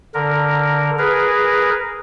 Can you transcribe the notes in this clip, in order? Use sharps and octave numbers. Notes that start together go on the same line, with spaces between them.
D3 A#4
G#4 A#4 B4